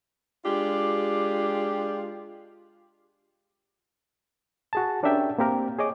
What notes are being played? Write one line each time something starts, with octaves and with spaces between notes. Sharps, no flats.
G#3 D4 F4 G4
F#4 G#4 A5
C#4 D4 G4 A#4 E5 G5
A#3 C4 G4 A#4
G#4 C#5 D#5 D6